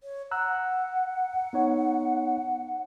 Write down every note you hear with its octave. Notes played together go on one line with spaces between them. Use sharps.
C#5
F#5 A#5 E6 F#6
B3 D#4 C#5